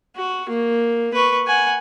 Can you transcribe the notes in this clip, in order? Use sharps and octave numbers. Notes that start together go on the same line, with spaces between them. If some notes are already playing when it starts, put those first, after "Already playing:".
F#4
A#3
B4 C#6
F#5 G#5